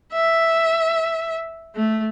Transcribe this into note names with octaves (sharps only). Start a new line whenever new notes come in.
E5
A3